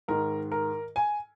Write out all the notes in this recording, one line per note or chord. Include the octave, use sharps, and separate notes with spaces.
G#2 D#3 A#4
A#4
G#5